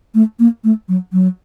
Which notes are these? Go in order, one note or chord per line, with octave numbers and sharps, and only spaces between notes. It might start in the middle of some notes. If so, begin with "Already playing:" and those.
A3
A#3
A3
F#3
F#3